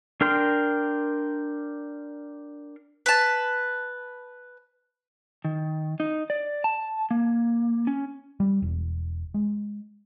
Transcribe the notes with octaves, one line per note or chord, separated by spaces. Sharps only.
D4 A#4 G5 C6
B4 A5
D#3
D#4
D5
A5
A#3
C#4
G3
E1
G#3